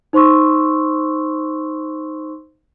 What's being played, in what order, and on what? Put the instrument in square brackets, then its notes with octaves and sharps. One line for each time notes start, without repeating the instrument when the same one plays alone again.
[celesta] D#4 C5 C6 C#6 E6